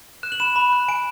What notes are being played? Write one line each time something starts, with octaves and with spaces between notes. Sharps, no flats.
F#6 E7
F#7
B5 E7
B5
F#6
G#5 D7